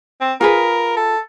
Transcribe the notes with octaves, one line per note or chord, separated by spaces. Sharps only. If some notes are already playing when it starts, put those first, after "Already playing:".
C4
F4 G#4 A#4 B4
A4